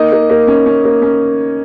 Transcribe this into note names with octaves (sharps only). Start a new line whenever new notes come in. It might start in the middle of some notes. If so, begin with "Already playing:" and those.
Already playing: A#3 D#4 D#5
A#3
A#3
C#4
C#4
A#3
C#4